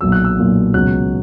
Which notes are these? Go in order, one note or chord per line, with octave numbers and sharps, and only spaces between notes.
B1 A#2 F#3 E6
F#6
E6
B1 A#2 F#3
C#2 B2 F#3 F#6